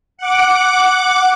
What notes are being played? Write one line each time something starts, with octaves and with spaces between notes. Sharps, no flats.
F#5 D6